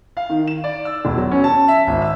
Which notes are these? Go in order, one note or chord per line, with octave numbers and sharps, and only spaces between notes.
F5
D#3
E7
D5
E6
E1
F#3
C#4
A5
E5
G#1
E6